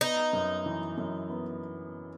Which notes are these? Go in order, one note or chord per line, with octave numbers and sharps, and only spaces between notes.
B3 D#4
F#2
E3
F#2
B3